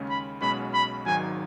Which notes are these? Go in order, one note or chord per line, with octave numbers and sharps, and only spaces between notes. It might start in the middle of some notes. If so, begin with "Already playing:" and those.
Already playing: D#2 C#3 G#3 C#4
B5
B1 B2 G#3 C#4 F#4 B5
B5
G#1 G#2 D#3 F#3 G#5